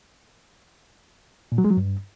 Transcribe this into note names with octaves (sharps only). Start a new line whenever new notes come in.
A#2
F#3
G#3
F#3
G2